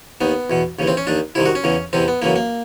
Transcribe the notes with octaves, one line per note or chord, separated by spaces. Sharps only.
D#2 D#3 B3
E2 B2
D#2 C#3 E3
C4
C#4
D#2 D#3 D4
C2 C3 D#3 E4
F#4
C#4
E2 C#3 E3
E2 C3 E3 C4
B3
F#2 C#3 E3 A#3
A#3